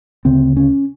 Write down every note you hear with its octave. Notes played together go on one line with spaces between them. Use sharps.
D2 C#3 C4
C#4